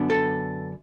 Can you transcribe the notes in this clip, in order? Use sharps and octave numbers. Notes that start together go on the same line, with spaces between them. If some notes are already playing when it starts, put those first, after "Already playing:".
Already playing: F#2 D3 B3 D4
A4